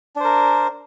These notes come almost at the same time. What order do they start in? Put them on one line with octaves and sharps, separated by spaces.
D4 C5 A#4